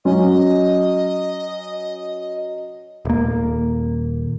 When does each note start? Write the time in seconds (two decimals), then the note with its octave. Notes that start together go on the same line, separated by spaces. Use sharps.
0.05 F#3 C#4 D#5
3.05 D#1 A#3